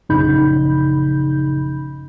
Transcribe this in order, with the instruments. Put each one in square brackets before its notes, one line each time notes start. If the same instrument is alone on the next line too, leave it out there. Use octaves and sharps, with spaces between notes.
[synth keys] A#1 F#2 C#3 D#4 B5 G6